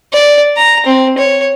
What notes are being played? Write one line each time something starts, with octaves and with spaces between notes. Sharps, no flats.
D5
A#5
C4
C#5